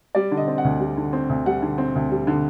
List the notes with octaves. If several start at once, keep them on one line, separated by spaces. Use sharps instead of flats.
G3 D5
D3
D#5
C4
F#5
D2
G3
D3
C4
D2
G3 F#5
D3
C4
D2
G3
D3